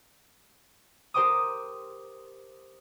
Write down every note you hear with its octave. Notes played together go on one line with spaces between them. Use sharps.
G4 A#4 C5 G5 D6 D#6